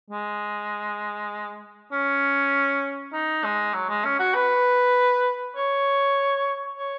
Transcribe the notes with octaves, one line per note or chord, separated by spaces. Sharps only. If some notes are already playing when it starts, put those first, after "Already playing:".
G#3
C#4
D#4
G#3
F#3
G#3
C#4
F#4
B4
C#5
C#5